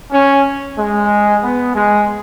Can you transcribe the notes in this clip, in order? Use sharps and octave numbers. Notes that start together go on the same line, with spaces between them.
C#4
G#3
B3
G#3